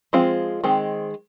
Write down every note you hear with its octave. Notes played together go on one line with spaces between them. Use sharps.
F3 G#3 C4 F4
D#3 G#3 C4